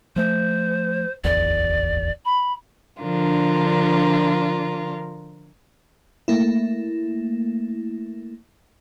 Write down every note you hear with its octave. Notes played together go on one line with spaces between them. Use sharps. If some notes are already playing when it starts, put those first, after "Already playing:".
F3 A3 C5
D1 G#1 E2 D5
B5
D3 F3 D4 F4 A#4
A3 A#3 E4